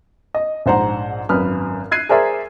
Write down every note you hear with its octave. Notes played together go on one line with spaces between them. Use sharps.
D#5
A#1 G#2 C5 F#5 A#5
G#1 F#2 B4 D#6 F6
F#6 G#6 C7 D#7
G#4 A#4 C5 D5 E5